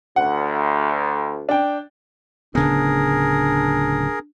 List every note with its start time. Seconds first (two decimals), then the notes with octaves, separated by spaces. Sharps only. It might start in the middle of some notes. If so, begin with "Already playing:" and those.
0.16 D2 F#5
1.49 D4 G5
2.55 D1 C#3 B3 D4 G#4 A#4